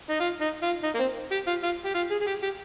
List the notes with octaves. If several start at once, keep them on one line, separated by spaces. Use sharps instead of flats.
D#4
F4
D#4
F4
D#4
A#3
C4
G4
F4
F4
G4
F4
G#4
G#4
G4
G4